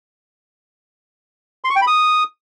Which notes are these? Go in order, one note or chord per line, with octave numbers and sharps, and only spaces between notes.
C6
C#6
G5
B5
D#6